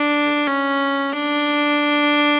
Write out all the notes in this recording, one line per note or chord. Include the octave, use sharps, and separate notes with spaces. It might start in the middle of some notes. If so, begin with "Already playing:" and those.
Already playing: D4
C#4
D4